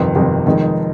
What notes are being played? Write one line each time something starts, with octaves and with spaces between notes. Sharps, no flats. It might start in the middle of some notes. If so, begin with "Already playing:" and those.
Already playing: G1 F2 C3 D#3
G1 F2 C3 D#3
F1 F2 D#3 G#3 D#4